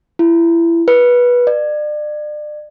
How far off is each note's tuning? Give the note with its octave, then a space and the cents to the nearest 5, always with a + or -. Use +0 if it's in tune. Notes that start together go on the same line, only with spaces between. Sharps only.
E4 +25
B4 -20
D5 +35